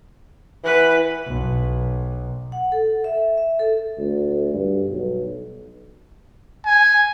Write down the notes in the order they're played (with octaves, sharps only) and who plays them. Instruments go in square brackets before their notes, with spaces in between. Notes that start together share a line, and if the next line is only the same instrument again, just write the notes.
[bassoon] E3 [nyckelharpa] B4 F#5
[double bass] B1
[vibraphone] F#5
A4
E5
E5
A4
[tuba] D2
G2
B1
[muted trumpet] G#5